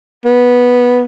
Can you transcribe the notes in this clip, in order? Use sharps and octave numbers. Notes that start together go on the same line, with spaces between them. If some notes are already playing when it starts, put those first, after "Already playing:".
B3